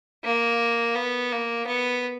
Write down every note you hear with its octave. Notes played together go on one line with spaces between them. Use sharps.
A#3
B3
A#3
B3